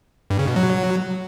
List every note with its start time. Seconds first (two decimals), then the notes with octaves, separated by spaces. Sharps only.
0.30 G2
0.39 C#3
0.48 B2
0.56 F#3